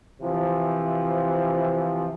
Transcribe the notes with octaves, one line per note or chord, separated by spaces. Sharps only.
C3 E3 F3